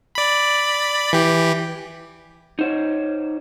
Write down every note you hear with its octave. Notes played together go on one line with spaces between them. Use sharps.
D5 B5
E3 G4
D#4 C5 C#5